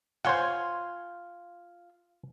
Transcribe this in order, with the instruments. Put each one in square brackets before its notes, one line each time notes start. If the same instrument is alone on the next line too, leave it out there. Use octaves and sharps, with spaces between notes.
[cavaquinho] F4 G#5 C6 [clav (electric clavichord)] C5 C#5 F#5